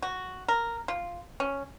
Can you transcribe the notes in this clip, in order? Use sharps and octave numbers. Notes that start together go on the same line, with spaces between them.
F#4
A#4
F4
C#4